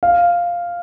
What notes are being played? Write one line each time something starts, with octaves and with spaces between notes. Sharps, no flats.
F5